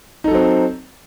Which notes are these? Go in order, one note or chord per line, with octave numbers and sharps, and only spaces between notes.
F#3 C4 D#4 A4